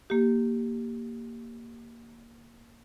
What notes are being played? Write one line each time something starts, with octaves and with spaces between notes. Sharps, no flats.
A#3 G4